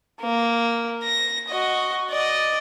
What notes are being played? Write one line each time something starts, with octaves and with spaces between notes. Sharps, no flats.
A#3
A#6
F#4 D#5
D5 D#5